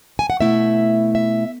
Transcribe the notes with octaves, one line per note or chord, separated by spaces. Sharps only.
G#5
F#5
B2 A3 E4 E5
E5